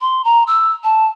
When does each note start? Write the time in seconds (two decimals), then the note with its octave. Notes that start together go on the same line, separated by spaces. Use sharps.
0.01 C6
0.25 A#5
0.47 E6
0.84 A5